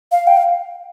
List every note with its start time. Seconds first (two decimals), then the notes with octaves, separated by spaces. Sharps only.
0.12 F5
0.27 G5
0.37 F5